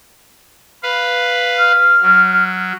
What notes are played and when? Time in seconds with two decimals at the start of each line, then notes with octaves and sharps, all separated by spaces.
0.83 B4 F5
1.58 F6
2.02 F#3